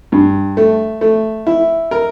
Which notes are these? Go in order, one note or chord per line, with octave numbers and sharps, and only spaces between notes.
G2
A3
A3
E4
A#4